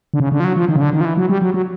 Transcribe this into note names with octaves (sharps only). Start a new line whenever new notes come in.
D3
C#3
D3
F3
F#3
F3
D#3
C#3
D3
D#3
F3
E3
F#3
G3
F#3
F#3